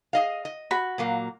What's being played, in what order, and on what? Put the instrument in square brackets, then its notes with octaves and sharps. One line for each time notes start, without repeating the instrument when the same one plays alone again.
[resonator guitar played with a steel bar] G#4 D#5 F5
D#5
[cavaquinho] F#4 B5
[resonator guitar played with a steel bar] A#2 F#3 A#3